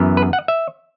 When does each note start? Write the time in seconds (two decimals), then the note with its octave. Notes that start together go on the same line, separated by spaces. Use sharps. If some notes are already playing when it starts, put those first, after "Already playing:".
Already playing: F#2 E3 B3
0.17 B4
0.33 F#5
0.48 E5